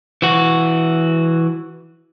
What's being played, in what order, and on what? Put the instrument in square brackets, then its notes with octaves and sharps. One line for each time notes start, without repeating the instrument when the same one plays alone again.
[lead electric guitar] E3 F#4